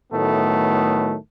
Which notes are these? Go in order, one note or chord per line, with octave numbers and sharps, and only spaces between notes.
A2 D#3 F#3 A3 B3